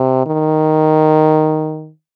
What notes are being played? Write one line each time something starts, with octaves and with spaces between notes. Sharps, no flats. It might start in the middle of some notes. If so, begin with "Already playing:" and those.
Already playing: C3
D#3